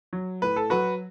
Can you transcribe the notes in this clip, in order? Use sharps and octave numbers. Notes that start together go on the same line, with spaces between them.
F#3
A2 B4
A4
F#3 F#4 B4